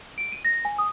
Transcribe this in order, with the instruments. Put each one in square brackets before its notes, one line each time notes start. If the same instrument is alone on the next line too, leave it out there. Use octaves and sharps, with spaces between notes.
[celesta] D7
D#7
A#6
G#5
D#6